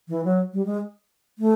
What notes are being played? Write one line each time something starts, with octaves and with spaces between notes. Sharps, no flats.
E3
F#3
G3
G#3
A3